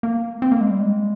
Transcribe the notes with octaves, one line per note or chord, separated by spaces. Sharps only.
A#3
C4
A#3
G#3
G3
G#3